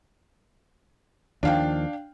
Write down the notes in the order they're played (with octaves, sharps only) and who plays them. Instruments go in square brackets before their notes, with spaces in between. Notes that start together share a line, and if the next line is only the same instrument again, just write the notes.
[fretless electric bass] D#2 D#3 F3 [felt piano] D4 F5 G5